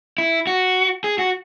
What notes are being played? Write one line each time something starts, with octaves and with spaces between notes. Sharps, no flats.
E4
F#4
G#4
F#4